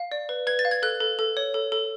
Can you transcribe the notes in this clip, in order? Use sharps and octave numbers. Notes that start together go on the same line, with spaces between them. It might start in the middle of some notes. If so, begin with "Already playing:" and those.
Already playing: F5
D5
B4
B4 G#6
A6
F5
G#6
A4 F#6
A4
A4
C#5
A4
A4